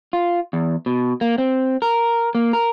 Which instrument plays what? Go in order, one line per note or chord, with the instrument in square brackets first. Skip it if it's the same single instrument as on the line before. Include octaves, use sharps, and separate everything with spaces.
[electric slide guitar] F4
E2
B2
A#3
C4
A#4
A#3
A#4